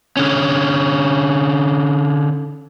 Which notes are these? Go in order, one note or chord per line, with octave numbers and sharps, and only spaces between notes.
D3 C#4